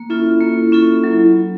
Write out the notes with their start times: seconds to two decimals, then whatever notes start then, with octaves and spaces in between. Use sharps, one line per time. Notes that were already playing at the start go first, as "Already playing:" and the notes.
Already playing: A#3
0.09 C#4 E4 F4 A4
0.25 E4
0.41 A#3
0.72 C#4 F4 A4
1.04 F#3 E4